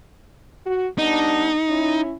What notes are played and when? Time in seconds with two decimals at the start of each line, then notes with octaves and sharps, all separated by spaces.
0.66 F#4
0.98 G3 B3 D4 D#4
1.69 C#4 E4